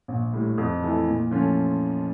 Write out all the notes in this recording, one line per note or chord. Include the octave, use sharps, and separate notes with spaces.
A#1
A2 G3
F2
E3 A3 E4 A4
A#2
F3 A3 C#4 F4